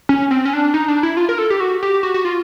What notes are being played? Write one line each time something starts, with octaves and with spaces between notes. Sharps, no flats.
C#4
C4
C#4
D4
D#4
D4
E4
F4
A#4
A4
G4
F#4
G4
F#4
F#4
F4